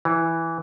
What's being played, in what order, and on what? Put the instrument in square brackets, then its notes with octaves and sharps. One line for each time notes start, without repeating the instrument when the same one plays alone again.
[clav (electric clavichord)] E3